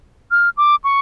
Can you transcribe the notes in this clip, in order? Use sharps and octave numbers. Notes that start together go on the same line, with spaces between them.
F6
D6
C#6